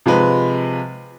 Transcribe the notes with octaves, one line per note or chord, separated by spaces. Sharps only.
C3 F3 G#3 B4